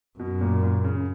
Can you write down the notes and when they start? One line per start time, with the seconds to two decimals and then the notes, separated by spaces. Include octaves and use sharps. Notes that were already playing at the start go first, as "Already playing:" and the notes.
0.19 F#2 B2
0.41 A#2
0.63 A#2
0.85 C#3